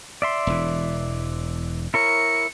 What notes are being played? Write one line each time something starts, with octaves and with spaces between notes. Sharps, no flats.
D5 E5 C6
E1 E3
E4 A#4 C#5 C#7